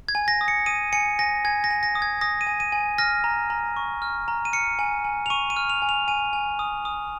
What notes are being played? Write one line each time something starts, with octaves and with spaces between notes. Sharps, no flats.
G#6
G#5
A#6
D#6
C#7
D#6 D#7
G#5 C#7
G#5 A#6
G#5 G#6
A#6
G#5
A#6
D#6
G#6
D#6 A#6
D#7
G#5
D#7
G#5
F6 A#6
A#5
A#5
C#6
F6
A#5
D#7
F6 C#7
G#5
G#5
F7
C#6 D#7
D#7
F6
F7
G#5
F7
G#5 D#7
G#5
D#6
D#6